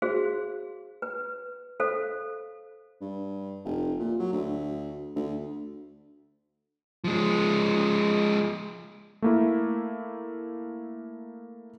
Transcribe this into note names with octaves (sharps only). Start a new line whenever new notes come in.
F#4 G#4 C5 F5
B4
A4 C5 F5
G2
F1
A#2
F#3
D2
D2
F3 G#3
A3 A#3 E4